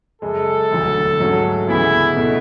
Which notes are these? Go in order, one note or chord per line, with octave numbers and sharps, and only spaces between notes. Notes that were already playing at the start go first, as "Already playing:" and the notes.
F#2 C#3 G#3 A4
E1 D2 D3 F#3
G#2 F#3 A3 C#4 F#4
D2 C#3 E3 B3 E4
B2 A3 E4